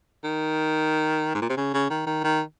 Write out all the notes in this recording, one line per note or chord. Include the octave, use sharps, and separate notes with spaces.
D#3
G#2
A#2
C3
C#3
C#3
D#3
D#3
D#3